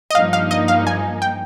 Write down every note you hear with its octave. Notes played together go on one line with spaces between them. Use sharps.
D#5
G2 F3 A#3 D#4 F5
F5
D#5
F5
G#5
G5